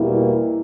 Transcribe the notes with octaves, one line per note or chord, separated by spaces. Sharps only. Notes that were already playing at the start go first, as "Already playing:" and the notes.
Already playing: E2 B2 G3 A#3 E4